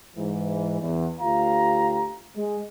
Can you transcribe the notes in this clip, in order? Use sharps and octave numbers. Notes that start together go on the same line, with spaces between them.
G#2 E3
E2
D2 F4 G4 F5 A#5
G#3